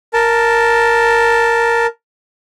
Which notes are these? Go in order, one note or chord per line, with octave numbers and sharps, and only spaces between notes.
A#4 A5